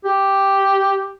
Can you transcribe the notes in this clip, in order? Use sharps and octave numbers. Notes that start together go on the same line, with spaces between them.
G4